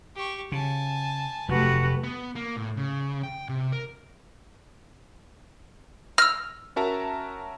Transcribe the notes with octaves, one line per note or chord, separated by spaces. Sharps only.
G4 C#6
C#3 G#5 A5
F1 F#3 A3 F#4 G4 B4
B3
A#3
A2
C#3
G5
C3
A#4
E6 F6 A#6
C#4 F#4 A#4 E5 A5 A#5